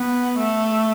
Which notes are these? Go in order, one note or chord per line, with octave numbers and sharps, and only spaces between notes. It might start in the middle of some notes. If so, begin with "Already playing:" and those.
Already playing: B3
A3